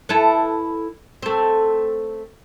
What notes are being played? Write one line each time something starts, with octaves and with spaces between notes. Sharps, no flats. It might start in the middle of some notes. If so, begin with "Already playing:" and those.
E4 A4 B4
A3 C4